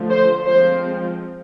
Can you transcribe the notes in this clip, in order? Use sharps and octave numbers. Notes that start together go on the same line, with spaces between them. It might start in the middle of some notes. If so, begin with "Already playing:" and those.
Already playing: D3 F3 A3
C5
F3 G#3 C4 C5